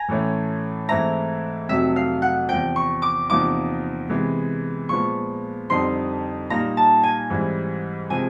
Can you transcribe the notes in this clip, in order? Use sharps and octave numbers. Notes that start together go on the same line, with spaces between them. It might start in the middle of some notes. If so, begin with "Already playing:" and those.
Already playing: G#5 A#5
A2 E3 A3 C#4
G#2 E3 A3 C4 E4 A#5
F2 C3 D#3 F#3 A3 E5
F5
F#5
E2 C3 F3 G5
C#6
D6
E2 C3 F3 A#3 D#4 D6
C3 E3 G#3 B3
A#2 F3 G#3 B3 C#6
F2 D3 G3 C4 D#4 C6
A#2 G3 A#3 D#4 A#5
A5
G#5
G#2 E3 G3 C4
C3 F3 G#3 G#5